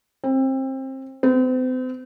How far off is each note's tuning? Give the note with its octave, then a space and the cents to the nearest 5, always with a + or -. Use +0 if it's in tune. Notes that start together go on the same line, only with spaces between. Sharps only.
C4 +25
C4 -40